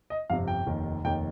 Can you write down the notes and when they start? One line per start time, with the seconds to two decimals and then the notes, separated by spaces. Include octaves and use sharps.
0.10 D#5
0.30 G1 F2 C3 F5
0.48 G5
0.67 F1 D#2 D#3
1.05 F1 D#2 D#3 G5